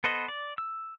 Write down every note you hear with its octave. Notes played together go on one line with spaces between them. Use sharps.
B3 A4 B4 C5 D#5
D5
E6